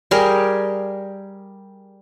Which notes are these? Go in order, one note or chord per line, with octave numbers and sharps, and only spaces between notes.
G3 G4 G#4 A#4